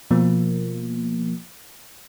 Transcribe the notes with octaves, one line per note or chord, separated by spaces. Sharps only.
B2 F3 A#3